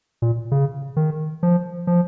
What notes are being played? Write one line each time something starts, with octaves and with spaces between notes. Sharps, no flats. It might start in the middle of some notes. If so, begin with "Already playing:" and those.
A#2
C#3
D#3
F3
F3